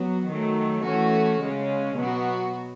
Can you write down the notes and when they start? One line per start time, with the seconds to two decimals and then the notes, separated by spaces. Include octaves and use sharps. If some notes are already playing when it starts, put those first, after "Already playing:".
Already playing: F#3 B3 F#4
0.31 D#3 F#3 A3
0.87 E3 A3 C#4 F#4
1.44 C#3 G#3 C#4
1.99 B2 F#3 B3 F#4